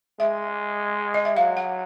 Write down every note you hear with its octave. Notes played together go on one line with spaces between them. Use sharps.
G#3 E5
D#5
E5
F#3 F5
F#5